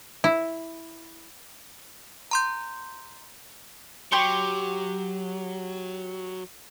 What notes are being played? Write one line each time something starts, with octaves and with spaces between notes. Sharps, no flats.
E4
A#5 C6 G6
F#3 G4 C6 C#6